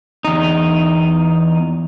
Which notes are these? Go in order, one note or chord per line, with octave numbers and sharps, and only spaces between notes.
E2 D#4